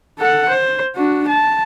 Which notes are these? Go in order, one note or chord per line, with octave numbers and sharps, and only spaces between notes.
A4 F#5
C5
D4 F#4
A5